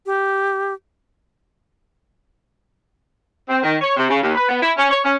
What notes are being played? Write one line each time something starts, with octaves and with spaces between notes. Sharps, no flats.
G4
C4
D#3
C#5
C3
C#3
D#2
B4
B3
E4
C#4
C#5
C#4